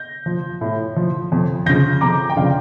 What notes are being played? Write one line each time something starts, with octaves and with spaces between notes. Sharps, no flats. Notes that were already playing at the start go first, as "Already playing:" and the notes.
Already playing: G6 A#6
F3
A2
F3
F2
C#3 F3 G6 A#6
F2 A#5 D6
G5
C#3 F3 D5 F5